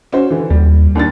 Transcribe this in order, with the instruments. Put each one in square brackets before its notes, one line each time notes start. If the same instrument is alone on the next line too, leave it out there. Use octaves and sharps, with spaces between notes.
[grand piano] C#4 F#4 C5
D3 E3
[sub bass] D#2 [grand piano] G3
[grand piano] D#2 D4 A6